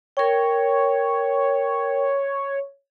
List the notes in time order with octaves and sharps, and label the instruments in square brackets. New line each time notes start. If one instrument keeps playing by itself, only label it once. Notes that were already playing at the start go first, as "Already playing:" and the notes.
[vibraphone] A#4 G5 [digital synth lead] C#5